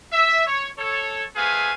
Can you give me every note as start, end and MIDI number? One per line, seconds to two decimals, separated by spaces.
0.13 0.46 76
0.47 0.68 73
0.78 1.24 69
0.78 1.24 73
1.36 1.72 57
1.36 1.72 60
1.36 1.72 68
1.36 1.72 71
1.36 1.72 77
1.36 1.72 80